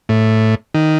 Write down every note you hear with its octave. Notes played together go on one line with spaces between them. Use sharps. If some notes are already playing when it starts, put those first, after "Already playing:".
A2
D#3